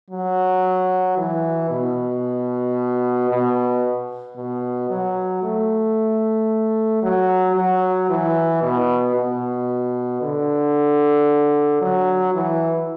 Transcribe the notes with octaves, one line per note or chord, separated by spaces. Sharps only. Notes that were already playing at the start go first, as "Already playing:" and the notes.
F#3
E3
B2
B2
B2
F#3
A3
F#3
F#3
E3
B2
B2
D3
F#3
E3